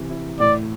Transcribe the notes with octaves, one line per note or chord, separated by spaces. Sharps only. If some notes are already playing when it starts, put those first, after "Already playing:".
Already playing: C3 E3
E4
A2 D5